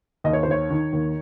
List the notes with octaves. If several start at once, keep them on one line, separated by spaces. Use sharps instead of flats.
D#2 D#5
C#5
C5
D#3 C#5
D#3
D#2